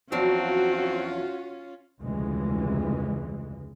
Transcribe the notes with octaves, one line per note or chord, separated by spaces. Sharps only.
E2 F3 F#3 C4 C#4 F4 F#4
F1 D2 G#2 C#3 E3 G#3